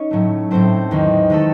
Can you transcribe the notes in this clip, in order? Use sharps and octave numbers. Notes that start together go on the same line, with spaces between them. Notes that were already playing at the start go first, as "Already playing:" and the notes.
Already playing: C#4 D#4 C#5
A2 F#3 A3
A2 F#3 A3 C4 C5
E2 D#3 G#3
D#3 G#3 A3 A4